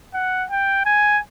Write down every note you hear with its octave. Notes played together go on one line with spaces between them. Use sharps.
F#5
G5
G#5